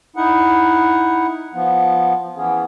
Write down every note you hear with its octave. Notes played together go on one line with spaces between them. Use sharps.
D#4 E4 F#5
F3 B3
E3 B3 C#4 G#4